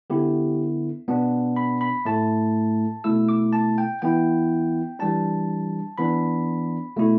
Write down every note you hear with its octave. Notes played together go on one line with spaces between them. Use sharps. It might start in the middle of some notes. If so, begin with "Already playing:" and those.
D3 B3 E4 G4
B2 B3 D4
B5
B5
A2 A3 E4 A5
B2 A3 E4 E6
D6
A5
G5
E3 B3 E4 G5
E3 G3 D4 A5
E3 B3 D4 B5
B2 A3 E4